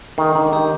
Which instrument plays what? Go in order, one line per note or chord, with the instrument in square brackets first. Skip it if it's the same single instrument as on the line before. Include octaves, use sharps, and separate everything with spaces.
[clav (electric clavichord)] D#3 [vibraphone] G#3
[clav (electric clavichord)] D#3 [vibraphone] D4
[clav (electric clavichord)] D#3 [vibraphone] G4